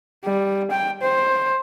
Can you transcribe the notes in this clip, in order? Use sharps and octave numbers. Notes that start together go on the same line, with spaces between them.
G3
G5
C5